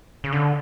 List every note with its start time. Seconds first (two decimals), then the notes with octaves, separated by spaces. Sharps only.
0.24 C#3
0.33 D3